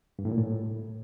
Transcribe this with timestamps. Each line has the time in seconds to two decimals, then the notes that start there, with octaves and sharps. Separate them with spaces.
0.19 G2
0.25 A2
0.31 A#2
0.38 A2